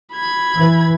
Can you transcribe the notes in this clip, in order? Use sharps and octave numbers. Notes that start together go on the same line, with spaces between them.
B5 G#6
E3